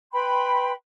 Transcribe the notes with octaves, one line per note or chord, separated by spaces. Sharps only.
B4 G5 B5 C6